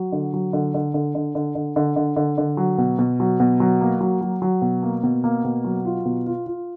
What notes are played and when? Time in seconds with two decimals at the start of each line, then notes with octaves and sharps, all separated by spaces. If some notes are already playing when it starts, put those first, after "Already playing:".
Already playing: F#3
0.12 D3
0.34 F#3
0.53 D3
0.74 D3
0.94 D3
1.15 D3
1.35 D3
1.55 D3
1.76 D3
1.96 D3
2.16 D3
2.38 D3
2.57 F#3
2.78 B2
2.99 B2
3.20 F#3
3.40 B2
3.60 F#3
3.81 A#3
4.01 F#3
4.21 F#3
4.42 F#3
4.62 B2
4.83 A#3
5.03 B2
5.24 A#3
5.44 B2
5.64 F#3
5.85 F4
6.05 B2
6.26 F4
6.46 F4